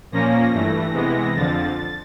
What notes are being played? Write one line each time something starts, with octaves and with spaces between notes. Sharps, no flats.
A#2 F3 A#3 C#4 A#6
G2 E3 A3
C3 E3 G#3 B3
F2 D3 F3 A6